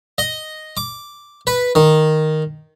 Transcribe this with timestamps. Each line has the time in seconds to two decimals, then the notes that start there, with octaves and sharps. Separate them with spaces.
0.18 D#5
0.77 D6
1.47 B4
1.75 D#3